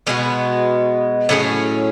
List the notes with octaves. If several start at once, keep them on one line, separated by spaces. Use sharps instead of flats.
B2 G#3 B3 F#4
A2 F#3 C#4 G#4